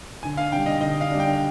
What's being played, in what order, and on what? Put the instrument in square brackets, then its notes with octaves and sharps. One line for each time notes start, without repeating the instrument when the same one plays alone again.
[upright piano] D3 [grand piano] G#5
[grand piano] F5
[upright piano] G3 D4 [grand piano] G5
[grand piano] D#5
[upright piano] D3 [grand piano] D#5
[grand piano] F5
[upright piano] G3 D4
[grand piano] G5